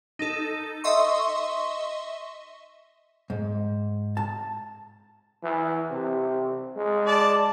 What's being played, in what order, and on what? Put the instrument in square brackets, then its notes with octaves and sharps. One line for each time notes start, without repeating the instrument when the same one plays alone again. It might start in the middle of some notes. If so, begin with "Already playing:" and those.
[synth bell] D#4 A4
D#5 E5 C6 C#6
[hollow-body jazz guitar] G#2
A5
[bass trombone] E3
C3
G#3
[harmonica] D5 A5